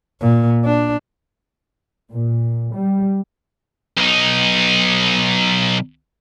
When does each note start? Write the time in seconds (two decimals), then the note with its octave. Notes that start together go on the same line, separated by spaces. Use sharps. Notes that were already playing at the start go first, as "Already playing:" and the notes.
0.21 A#2
0.65 D4
2.10 A#2
2.74 G3
3.97 B1 D#4